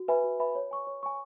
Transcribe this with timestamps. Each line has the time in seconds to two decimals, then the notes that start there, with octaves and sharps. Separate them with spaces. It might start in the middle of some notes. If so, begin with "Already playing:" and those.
Already playing: F#4
0.08 B4 E5 G#5 B5
0.24 F#4
0.40 B4 E5 G#5 B5
0.55 C#5
0.71 G#5 C#6
0.87 C#5
1.03 G#5 C#6